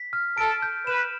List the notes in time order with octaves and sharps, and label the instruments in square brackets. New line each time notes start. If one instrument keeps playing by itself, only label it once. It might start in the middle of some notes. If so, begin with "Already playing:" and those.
Already playing: [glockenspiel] B6
F6
[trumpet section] A4 [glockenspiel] D7
[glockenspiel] G6
[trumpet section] B4 [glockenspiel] E7